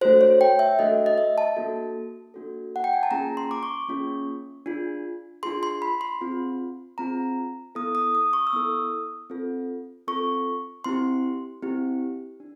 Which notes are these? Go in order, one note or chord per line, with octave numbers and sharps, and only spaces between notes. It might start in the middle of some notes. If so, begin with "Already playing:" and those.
A3 D4 F#4 A4 C5
C#5
G5
E5
A3 D4 F#4 A4 D#5
D#5
E5
A5
A#3 D4 F#4 A4
A#3 D4 F#4 A4
F#5
G5
G#5
A5
A#3 C#4 F4 G#4 A#5
C6
D6
C#6
A#3 C#4 F4 G#4
D4 F4 G#4
D4 F4 G#4 C6
C6
B5
C6
C4 F4 G#4
C4 F4 G#4 A#5
B3 E4 A4 D#6
D#6
D#6
C#6
E6
B3 E4 A4 D#6
C4 F4 A4
C4 F4 A4 C#6
C4 E4 G4 C6
C4 E4 G4
D4